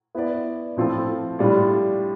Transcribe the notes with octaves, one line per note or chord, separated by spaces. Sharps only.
B3 E4 B4 D5
A2 F3 C4 F4 A4
A2 G3 D4 F4